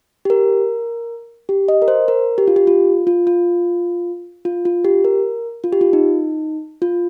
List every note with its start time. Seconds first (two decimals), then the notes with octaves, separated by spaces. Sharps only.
0.25 G4
0.30 A#4
1.49 G4
1.68 D#5
1.82 A#4
1.88 C5
2.08 A#4
2.38 G4
2.48 F4
2.56 G4
2.67 F4
3.07 F4
3.27 F4
4.45 F4
4.65 F4
4.85 G4
5.05 A#4
5.64 F4
5.73 G4
5.81 F4
5.93 D#4
6.82 F4